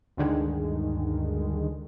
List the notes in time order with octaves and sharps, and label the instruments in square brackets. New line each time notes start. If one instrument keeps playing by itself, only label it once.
[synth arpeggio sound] D2 G2 D3 D#3 G#3